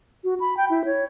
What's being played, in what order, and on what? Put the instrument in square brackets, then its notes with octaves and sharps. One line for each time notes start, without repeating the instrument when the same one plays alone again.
[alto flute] F#4
B5
G5
E4
C#5